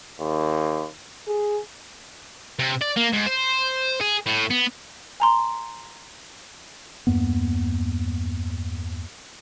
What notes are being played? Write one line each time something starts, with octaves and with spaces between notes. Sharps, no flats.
D#2
G#4
C3
D5
A#3
G#2
C5
G#4
A2
B3
G#5 A#5 C6
E2 G2 A#3 B3